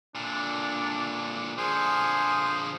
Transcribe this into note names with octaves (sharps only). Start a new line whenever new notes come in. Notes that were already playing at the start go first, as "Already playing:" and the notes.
A#2 D3 D4
D3 F3 G#4 C5 G#5 D#6